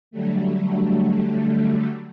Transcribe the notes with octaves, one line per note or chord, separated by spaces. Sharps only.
D3 F#3 G3 A3